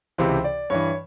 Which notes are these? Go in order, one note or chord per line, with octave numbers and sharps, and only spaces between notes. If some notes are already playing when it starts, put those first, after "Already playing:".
C#2 C3 E3 C5
D5
G2 E3 C#5